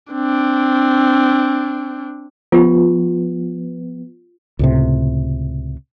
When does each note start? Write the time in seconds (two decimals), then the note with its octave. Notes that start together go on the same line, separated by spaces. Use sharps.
0.13 C4 D4
2.52 F3 B3 F4 G4
4.59 C#2 A2 C3